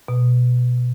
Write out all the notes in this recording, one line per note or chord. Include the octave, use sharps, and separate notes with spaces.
B2